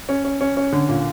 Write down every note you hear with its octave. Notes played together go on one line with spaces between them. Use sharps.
C#4
C#4
C#4
C#4
D3
A#2